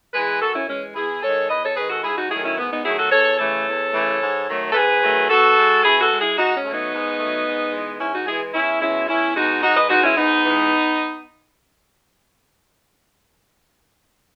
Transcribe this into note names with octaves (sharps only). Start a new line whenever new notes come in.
E3 G#3 G#4 B4
F#2 F#4 A4
C#4 E4
E3 G#3 C#4
E2 E4 G#4
D#3 G#3 A4 C#5
E2 B4 D#5
A4 C#5
D#3 G#3 G#4 B4
F#4 A4
G#2 E4 G#4
D#4 F#4
D#3 F#3 A3 E4 G#4
C#4 E4
G#2 B3
B3 D#4
D#3 F#3 A3 E4 G#4
F#4 A4
E2 A4 C#5
C#3 E3 A3 A4 C#5
E2
C#3 E3 A3
G#2
D#3 F#3 A3
A4
G#2 G#4 B4
D#3 F#3 A3
B2 F#4 A4
G#3
B2 E4 G#4
F#4 A4
G#3
E4 G#4
G#2 D#4 F#4
C#4
F#3 A3
B3 D#4
G#2
F#3 A3
G#2
E3 G#3
G#2 C#4 E4
D#4 F#4
E3 G#3 E4 G#4
E2 C#4 E4
B2 G#3 C#4 E4
E2 C#4 E4
B2 G#3 D#4 F#4
G#2 D#4 F#4
B4 D#5
E3 G#3 D#4 F#4
C#4 E4
G#2 B3 D#4
E3 G#3